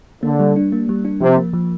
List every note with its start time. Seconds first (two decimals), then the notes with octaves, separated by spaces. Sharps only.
0.23 D3 A#3
0.39 G3
0.56 D4
0.72 A#3
0.89 G3
1.05 D4
1.21 C3 F3
1.37 A#3
1.53 F3